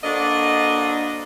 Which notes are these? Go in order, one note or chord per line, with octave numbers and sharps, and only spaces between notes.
A#3 D4 F#4 A4 C5 D#5